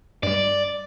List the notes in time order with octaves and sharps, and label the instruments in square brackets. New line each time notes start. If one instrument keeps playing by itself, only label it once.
[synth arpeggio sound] G2 G3 [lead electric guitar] D5